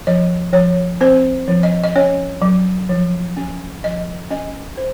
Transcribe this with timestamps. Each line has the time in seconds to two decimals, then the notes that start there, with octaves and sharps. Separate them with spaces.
0.07 F3 D#5
0.53 F3 C#5
1.01 C4 C5
1.48 F3
1.63 D#5
1.84 D#5
1.96 C#4 C#5
2.42 F#3
2.89 F3
3.37 C#4
3.84 F3 D#5
4.31 C#4 D#5
4.77 C5